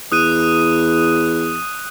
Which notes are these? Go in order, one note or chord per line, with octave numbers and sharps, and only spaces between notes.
E2 D#6 F#6 D#7